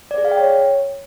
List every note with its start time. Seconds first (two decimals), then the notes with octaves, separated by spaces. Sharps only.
0.11 D5
0.18 G#4
0.25 F5
0.31 G5
0.38 C#5